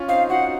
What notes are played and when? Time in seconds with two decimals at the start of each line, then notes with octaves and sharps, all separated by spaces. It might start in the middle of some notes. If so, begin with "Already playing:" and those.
Already playing: C#4 F4
0.08 C4 D#4 F5
0.29 D#4 F#4 F#5